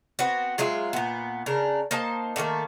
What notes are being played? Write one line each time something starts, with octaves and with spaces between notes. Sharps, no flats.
B3 C4 F#4
F#3 G#3 F4 E5
A#2 B3
C#3 D4 A#4
A#3 D#4 C5 A5
D3 D#3 A3 A#3